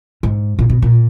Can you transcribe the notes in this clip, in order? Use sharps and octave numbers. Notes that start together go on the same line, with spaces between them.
G#2
A#2
B2
A#2